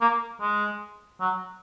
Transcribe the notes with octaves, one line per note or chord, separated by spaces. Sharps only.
A#3
G#3
F#3